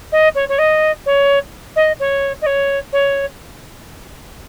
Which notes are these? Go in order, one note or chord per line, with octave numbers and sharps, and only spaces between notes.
D#5
C#5
C#5
D#5
C#5
D#5
C#5
D#5
C#5
C#5